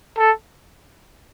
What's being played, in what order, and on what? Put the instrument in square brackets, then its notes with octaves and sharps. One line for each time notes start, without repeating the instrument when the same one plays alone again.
[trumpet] A4